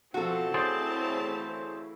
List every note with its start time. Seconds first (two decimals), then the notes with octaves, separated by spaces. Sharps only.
0.14 B2 F3 C4 F#4 A4 A5
0.54 C#3 E3 A3 G#4 C5 D5